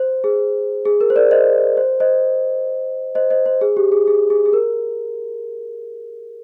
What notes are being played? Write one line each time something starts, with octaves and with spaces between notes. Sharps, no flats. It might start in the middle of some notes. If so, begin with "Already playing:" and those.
Already playing: C5
G#4
G#4
A#4
C5
A#4 D5
C5 D#5
C5
C5 D#5
C5 D#5
C5 D#5
C5
G#4
G4
G#4
G#4
G#4
G#4
A#4